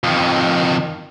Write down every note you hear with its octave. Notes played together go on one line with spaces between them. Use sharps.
F2 D#3